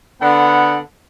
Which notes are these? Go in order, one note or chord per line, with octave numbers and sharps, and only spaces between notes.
D3 B3 F#5